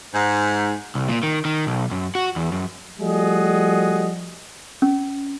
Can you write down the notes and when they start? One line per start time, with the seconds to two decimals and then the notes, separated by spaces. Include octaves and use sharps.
0.14 G#2
0.95 C2
1.09 A#2
1.23 D#3
1.45 D#3
1.67 B1
1.91 F#2
2.15 F#4
2.36 E2
2.52 F#2
3.00 F3 G3 A3 F#4 G#4 D#5
4.82 C#4